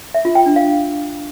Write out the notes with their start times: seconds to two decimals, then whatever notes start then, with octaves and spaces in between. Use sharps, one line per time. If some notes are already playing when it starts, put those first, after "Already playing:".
0.14 E5
0.25 F4
0.35 G5
0.46 D4
0.56 F5